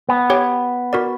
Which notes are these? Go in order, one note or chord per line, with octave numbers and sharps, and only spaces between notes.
B3
G4 C#5 G5
F#4 A#4 D5